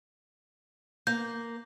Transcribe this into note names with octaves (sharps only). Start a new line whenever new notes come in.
A#3 G6